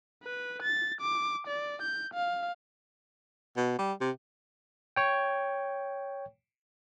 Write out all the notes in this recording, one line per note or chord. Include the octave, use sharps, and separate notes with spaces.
B4
A6
D6
D5
G6
F5
B2
G3
C3
C#5 G5